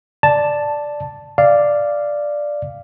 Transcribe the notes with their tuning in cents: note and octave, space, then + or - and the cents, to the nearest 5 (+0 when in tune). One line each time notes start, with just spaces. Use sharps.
D5 +0 A5 +0
D5 +0 F5 -10